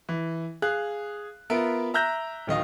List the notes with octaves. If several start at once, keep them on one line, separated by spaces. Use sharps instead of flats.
E3
G#4 F5 F#6
B3 F4 A#4 E5 D7
E5 A#5 E6 F#6 G6 A#6
D1 D#3 D#5 F5